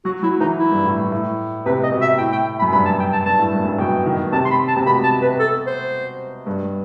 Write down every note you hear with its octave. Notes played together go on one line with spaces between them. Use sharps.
F#3 F#4
F#3 E4
E3 D#4
E4
G2
A2
A2
A2
C3 B4
D#5
B2
E5
A2 G5
G5
B5
F#2
G2 B5
A5
G5
A5
G2 A5
A2
G2
F#2
G2
B2 G5
D#3
C3 A5
C6
B5
A5
C3
B2 B5
A5
B4
A4
C5
G2